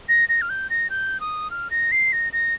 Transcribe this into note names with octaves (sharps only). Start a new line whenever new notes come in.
A#6
A#6
F6
G6
A#6
G6
D#6
F6
A#6
C7
A#6
A#6